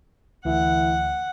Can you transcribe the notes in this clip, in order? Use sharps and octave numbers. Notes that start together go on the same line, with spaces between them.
D2 E3 F#5